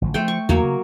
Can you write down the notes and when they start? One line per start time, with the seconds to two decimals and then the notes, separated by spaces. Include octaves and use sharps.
0.02 A1 D3 F3
0.14 F3 A3 C5 G5
0.28 C#6
0.49 E2 F#3 A#3 C#5
0.63 C#3